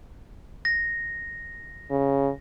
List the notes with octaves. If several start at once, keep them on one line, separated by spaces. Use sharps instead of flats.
A#6
C#3